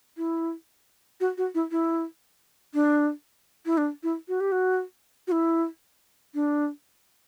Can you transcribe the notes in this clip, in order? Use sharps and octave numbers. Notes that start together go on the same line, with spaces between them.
E4
F#4
F#4
E4
E4
D4
E4
D4
E4
F#4
G4
F#4
F#4
E4
D4